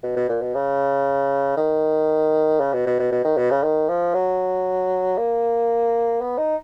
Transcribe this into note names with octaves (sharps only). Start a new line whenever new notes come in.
B2
B2
A#2
B2
C#3
D#3
C#3
B2
B2
B2
B2
D#3
B2
C#3
D#3
F3
F#3
A#3
B3
D#4